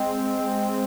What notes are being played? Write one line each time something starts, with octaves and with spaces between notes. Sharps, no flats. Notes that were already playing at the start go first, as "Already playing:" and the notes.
Already playing: G#3 C4